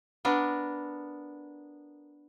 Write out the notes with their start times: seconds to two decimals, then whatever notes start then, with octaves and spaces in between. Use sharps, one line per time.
0.25 B3 D4 A#4